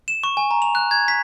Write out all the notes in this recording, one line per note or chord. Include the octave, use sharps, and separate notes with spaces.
E7
C#6
G#5
A#5
F7
F#6
G#6
B6